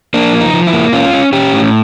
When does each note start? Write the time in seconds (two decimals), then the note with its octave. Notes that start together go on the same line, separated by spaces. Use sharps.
0.14 A#3 D4
0.33 F3
0.41 D#4
0.54 F3
0.67 E4
0.73 A#3
0.93 C#4 F4
1.13 C#4
1.33 C#4 G4
1.53 A2